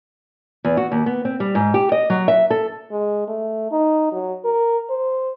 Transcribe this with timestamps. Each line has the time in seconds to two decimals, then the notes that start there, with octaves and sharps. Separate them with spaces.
0.65 E2
0.77 F#4
0.92 D#2
1.06 B3
1.25 C4
1.40 G3
1.55 G#2
1.74 G4
1.92 D#5
2.10 F#3
2.28 E5
2.50 A4
2.91 G#3
3.28 A3
3.71 D#4
4.12 F#3
4.45 A#4
4.90 C5